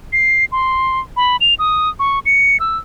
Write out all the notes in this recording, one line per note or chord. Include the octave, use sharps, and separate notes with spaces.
C7
C6
B5
F7
D#6
C#6
C#7
E6